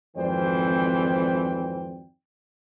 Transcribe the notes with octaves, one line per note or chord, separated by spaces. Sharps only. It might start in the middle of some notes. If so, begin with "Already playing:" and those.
G#1 F2 E3 C5 D5 G5